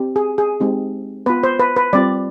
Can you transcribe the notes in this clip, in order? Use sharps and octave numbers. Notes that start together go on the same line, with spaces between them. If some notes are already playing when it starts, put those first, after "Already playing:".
Already playing: C4 G4
G#4
G#4
G#3 C4 D#4 G4
B3 F4 B4
C5
B4
B4
G3 C4 F4 D5